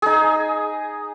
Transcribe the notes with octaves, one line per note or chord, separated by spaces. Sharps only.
D#4 G#4